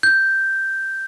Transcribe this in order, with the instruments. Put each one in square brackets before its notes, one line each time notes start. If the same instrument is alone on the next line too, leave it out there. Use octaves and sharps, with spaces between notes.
[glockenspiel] G6